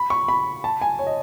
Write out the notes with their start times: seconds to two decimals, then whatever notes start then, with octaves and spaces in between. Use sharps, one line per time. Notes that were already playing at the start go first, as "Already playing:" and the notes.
Already playing: B5
0.10 C#6
0.28 B5
0.64 A5
0.81 G#5
0.99 C#5
1.07 D#5